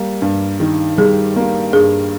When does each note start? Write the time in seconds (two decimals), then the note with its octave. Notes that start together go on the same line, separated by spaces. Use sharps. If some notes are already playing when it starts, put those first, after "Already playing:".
Already playing: G3 A#3
0.22 G2
0.60 D#3
0.98 G3 G#4
1.36 A#3
1.73 G2 G#4